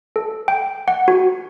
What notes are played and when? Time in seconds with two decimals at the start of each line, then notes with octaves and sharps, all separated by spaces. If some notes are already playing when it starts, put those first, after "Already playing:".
0.16 A4
0.48 G5
0.88 F#5
1.08 F#4